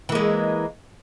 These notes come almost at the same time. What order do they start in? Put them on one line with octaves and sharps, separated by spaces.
E3 A#3 G#3